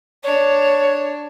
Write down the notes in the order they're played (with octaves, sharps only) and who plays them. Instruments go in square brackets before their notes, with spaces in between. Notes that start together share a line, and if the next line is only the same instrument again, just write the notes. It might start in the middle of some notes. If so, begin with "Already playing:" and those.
[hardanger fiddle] D4 [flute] C#5